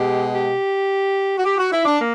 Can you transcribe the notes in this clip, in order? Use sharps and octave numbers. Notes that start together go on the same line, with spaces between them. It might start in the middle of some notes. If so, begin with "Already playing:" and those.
Already playing: B2 G#3 G4
G4
F#4
G4
F#4
E4
D4
A#3